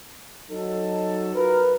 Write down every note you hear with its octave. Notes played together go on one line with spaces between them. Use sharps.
F#3 D#4 A4
F4 F#4 A#4 B4